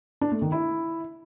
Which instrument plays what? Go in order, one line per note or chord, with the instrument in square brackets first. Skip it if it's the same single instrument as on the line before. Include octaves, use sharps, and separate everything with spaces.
[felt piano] D4
A3
D#3
E4